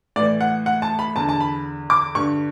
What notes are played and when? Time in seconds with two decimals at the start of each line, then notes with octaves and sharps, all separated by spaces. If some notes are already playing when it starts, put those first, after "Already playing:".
0.16 A2 E3 D5
0.41 F#5
0.66 F#5
0.82 A5
0.99 B5
1.16 E2 D3 A5
1.29 A5
1.40 B5
1.90 D6
2.15 G2 D3 C#6